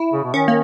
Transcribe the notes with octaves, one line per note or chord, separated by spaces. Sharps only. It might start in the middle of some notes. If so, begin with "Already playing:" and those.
Already playing: E4
C#3
B2
D#3 C#4
A#3